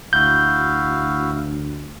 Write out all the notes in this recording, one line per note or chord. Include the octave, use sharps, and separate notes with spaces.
D2 E4 F#4 F5 G6